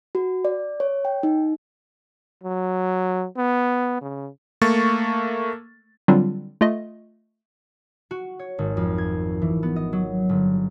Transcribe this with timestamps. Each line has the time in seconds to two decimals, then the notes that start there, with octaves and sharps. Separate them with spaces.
0.15 F#4
0.45 D5
0.80 C#5
1.05 G5
1.23 D#4
2.44 F#3
3.37 B3
4.02 C#3
4.62 A3 A#3 C#6 A6
6.08 D3 F#3 G3 C4 D4 F4
6.61 A3 F4 D#5
8.11 F#4
8.39 C#5
8.58 G#1
8.77 F2
8.98 G#6
9.42 E3
9.63 B3
9.76 D#5
9.93 F#3
10.29 G1